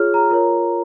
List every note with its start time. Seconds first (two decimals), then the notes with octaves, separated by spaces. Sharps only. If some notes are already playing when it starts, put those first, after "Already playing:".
Already playing: F4 G#4 C#5 F6
0.14 A#5
0.30 F4 A#4 C#5